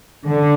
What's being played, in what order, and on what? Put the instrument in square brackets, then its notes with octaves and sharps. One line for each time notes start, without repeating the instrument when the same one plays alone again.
[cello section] D3